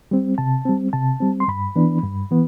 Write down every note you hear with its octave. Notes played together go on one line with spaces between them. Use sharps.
G3 C4
C3 A5
G3 C4
C3 A5
G3 C4
C6
G2 B5
E3 B3 D4
G2
E3 B3